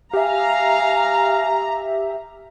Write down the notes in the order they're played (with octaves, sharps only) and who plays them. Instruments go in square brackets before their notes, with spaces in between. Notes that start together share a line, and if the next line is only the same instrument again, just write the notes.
[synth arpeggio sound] G4 E5 [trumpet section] F5 [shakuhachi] G#5 [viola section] A#5